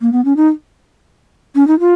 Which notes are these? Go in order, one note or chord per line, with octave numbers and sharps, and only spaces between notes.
A#3
B3
C#4
D#4
C#4
D#4
F4